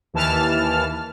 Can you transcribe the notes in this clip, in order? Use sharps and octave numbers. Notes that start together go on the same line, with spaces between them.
D#2 E3 A5 F6